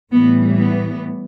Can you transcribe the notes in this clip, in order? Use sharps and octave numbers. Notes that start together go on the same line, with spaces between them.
A2 E3 G3 B3
B3